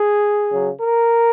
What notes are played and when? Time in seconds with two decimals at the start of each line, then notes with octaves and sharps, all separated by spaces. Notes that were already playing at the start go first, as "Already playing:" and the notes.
Already playing: G#4
0.51 C#3 F#3
0.80 A#4